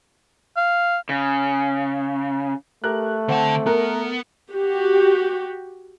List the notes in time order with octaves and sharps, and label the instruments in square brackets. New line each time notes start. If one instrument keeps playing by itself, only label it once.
[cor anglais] F5
[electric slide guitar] C#3
[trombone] A3 [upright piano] G4 A#4 F#6
[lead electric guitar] D3 A5 [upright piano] C4 F#5
[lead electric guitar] B3 [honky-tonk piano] A#4 [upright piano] F#6
[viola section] F#4 G4